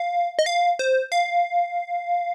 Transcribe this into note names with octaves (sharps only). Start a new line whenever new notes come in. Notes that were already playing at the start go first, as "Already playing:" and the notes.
Already playing: F5
D#5
F5
C5
F5